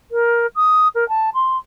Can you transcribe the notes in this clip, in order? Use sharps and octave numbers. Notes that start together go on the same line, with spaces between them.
A#4
D#6
A#4
A5
C6